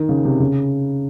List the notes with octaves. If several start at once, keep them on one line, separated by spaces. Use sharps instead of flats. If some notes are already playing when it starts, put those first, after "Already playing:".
Already playing: D#3
C#3
C3
C#3